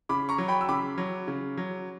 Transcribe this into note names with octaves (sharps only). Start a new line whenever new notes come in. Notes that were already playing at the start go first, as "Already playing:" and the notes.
C#3 B5 D6
A#5 C#6
F#3
G5 B5
E6
C#3 B5 D6
F#3
C#3
F#3